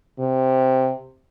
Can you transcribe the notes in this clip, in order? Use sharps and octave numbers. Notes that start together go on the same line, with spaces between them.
C3